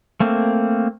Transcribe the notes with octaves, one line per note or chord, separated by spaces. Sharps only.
A3 A#3 C4